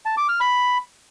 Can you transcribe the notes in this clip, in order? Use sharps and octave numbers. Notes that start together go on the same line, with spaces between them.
A5
D6
F6
B5